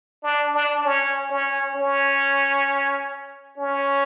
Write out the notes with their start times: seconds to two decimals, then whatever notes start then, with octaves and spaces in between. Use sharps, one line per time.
0.23 D4
0.55 D4
0.84 C#4
1.30 C#4
1.75 C#4
3.57 C#4